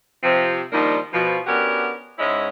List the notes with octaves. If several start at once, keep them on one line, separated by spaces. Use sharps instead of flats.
C3 F3 C4
D#3 F3 G3 A#3 D4 D#4
B2 F3
B3 C#4 D4 F#4 G4 A#4
G#2 G#3 C#4 E4 C#5 D#5